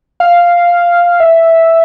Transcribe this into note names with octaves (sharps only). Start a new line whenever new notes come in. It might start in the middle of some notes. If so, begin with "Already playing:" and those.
F5
E5